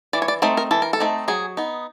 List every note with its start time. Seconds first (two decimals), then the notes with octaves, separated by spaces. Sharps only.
0.13 E3 D5
0.22 C#5
0.28 D5
0.42 A3 C4 D#4 C5
0.57 A#4
0.71 E3 A4
0.82 A#4
0.93 A4
1.00 A3 C4 D#4
1.28 F#3 G#4
1.57 B3 D#4